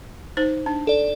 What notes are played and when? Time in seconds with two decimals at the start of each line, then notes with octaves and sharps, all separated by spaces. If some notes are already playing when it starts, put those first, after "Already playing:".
0.37 D#4 C5
0.66 D4
0.87 A4 D5